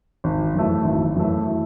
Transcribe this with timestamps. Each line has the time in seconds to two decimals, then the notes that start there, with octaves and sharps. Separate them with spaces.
0.24 G#1
0.54 F#2 E3 A3
0.84 G#1
1.15 F#2 E3 A3